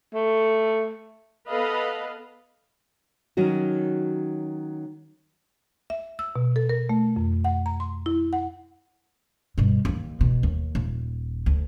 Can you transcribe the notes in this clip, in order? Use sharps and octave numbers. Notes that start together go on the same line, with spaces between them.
A3
B3 A4 B4 D#5 F5
D#3 F#3 C#4 F#4
E5
E6
B2
A4
A#4
A3
F2
F#5
A#5
C6
E4
F#5
G2 B2
D#2 D#3
B2
D#2
D#1
D2